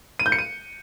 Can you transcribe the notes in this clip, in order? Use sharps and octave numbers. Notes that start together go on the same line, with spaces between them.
D#7
G6
C#7
D#7